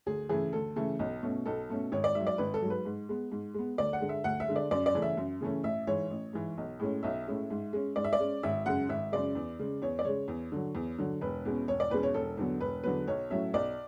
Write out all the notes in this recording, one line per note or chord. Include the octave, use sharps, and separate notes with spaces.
D2 G#4
C#3 E3 A3 G#4
D2 A4
C#3 E3 A3
B1
B2 A3 C#4
B1 A4
B2 A3 C#4
G#1 C#5
D5
G#2 E5
F#3
D5
G#1 B4
A4
G#2 F#3
B4
G#2
G#3 B3
G#2
G#3 B3
D2 D5
F#5
D3 G#3
E5
D2 F#5
E5
D3 G#3
D5
F#2 D5
D5
C#3 E3 A3 C#4
E5
F#2
C#3 E3 A3 C#4
A1 E5
G#2 E3 C#5
A1
G#2 E3
B1
A2 G#3 C#4
B1 E5
A2 G#3 C#4
G#2
G#3 C#4
G#2 D5
E5
D5
G#3 C#4
G#1 E5
F#2 C#3 G#3 F#5
G#1 E5
F#2 C#3 G#3 D5
E2
C#3 G#3
E2 C#5
D5
C#3 G#3 C#5
E2
D3 F#3
E2
D3 F#3
E1 B4
E2 B2 G#3 C#4
E1 C#5
D5
E2 B2 G#3 C#4 B4
C#5
E1 A4
E2 D3 F#3 B3
E1 B4
E2 D3 F#3 B3 B4
B1 C#5
A2 F#3 C#4 E5
B1 D5